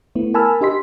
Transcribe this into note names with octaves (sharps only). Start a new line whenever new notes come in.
A3 B3 E4
A#4 G#5 A5 B5 E6 F6
D4 G4 D#5 C6 B6